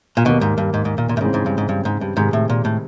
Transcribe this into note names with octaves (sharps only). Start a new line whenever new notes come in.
A#2
D#2 B2 D#3 G3 A#3
G#2
G2
G#2
G#2
A#2
A#2
A2
G#2 C#3 E3 G#3 C4
G#2
G2
G#2
G2
G#2
G2
G#2 C3 D#3 G#3
A2
A#2
A2